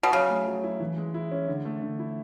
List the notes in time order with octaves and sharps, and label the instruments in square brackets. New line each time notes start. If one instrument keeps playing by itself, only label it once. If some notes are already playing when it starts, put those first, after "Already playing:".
[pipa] B2
[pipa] C#3 [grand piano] F#3
[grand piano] A3
F#3
E4
E3
G#3
E4
C#4
D3
A3
D3
E4